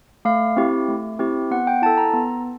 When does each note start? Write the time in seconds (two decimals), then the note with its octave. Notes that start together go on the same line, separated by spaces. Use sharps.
0.25 A3 F5
0.57 C4 E4 G4
0.88 A3
1.19 C4 E4 G4
1.51 B3 F#5
1.67 G5
1.82 E4 A5
1.86 A4
1.98 A#5
2.13 B3